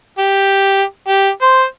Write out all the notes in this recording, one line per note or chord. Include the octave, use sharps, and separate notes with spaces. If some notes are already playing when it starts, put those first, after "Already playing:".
G4
G4
C5